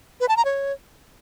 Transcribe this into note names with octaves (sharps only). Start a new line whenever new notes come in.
B4
A5
A#5
C#5